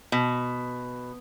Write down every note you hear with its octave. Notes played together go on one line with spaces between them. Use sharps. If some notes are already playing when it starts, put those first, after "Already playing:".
B2